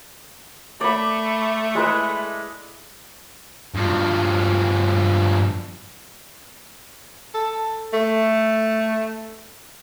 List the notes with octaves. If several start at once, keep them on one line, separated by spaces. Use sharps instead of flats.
A3 D5 B5
G#3 E4 B4
G2 F3
A4
A3